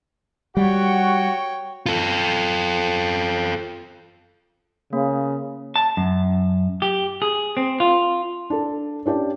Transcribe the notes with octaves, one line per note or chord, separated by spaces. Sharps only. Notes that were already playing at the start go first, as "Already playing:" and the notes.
G3 F#4 C#5 F#5 G5 C#6
F4 A4
C#3 A#3
A5
F#2
G4
G#4
C4
F4
D4 A4
C#4 D4 G4 D5